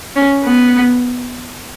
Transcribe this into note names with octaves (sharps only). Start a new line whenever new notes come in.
C#4
B3